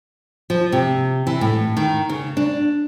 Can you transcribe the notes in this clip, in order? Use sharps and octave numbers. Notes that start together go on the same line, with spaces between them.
F3
C3
E3
A2
D#3
C#3
D4